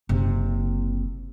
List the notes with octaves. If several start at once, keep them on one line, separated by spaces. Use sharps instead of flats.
F#1 C3